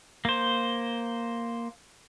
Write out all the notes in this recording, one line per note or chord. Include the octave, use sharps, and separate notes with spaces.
A#3 C5